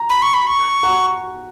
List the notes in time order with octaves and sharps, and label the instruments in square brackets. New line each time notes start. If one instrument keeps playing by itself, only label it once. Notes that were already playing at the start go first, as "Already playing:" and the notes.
Already playing: [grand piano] A#5
[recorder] B5
C#6
B5
C#6
[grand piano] F#5 A#5